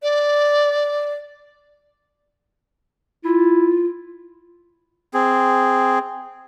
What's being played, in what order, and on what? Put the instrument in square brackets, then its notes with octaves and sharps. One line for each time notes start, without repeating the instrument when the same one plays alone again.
[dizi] D5
[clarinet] E4 [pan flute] F4
[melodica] C4 G#4